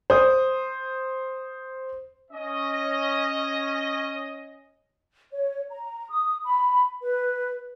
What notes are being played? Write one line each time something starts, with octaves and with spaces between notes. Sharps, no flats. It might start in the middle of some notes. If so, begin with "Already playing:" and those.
C5 D#6
C#4 D#5
C#5
A#5
D#6
B5
B4